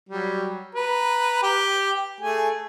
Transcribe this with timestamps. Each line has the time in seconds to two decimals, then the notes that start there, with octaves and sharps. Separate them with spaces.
0.09 F#3 G3
0.75 B4 A#5
1.43 G4 G5
2.20 A3 G#4 G#5